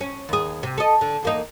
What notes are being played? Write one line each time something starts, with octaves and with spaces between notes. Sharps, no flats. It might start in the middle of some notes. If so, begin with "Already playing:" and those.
C#4
D#2 G#4
C3
A4 D#5
D3
E2 A#3 D#4